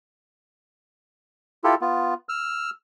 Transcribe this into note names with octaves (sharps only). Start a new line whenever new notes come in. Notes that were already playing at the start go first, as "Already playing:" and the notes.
E4 F4 G4 A4
B3 F4
E6 F6